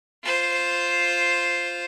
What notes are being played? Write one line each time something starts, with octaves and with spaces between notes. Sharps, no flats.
F4 C5